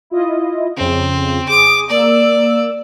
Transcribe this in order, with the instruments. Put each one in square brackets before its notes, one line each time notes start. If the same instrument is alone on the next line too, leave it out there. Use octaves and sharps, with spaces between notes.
[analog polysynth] E4 F4 D#5
[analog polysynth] F2 C#3 [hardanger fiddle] C4
[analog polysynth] G#4 D#6 [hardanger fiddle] D6
[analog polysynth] A#3 E6 [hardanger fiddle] D5